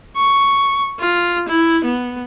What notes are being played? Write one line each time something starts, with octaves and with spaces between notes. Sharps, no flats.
C#6
F4
E4
B3